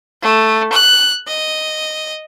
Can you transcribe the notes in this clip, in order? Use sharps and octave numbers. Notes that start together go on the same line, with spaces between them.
A3
F#6
D#5